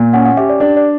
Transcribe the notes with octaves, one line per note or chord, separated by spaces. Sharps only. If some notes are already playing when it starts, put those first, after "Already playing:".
Already playing: A#2
C#4 F#5
F#5
G4 E5
D5
D4 D5
D5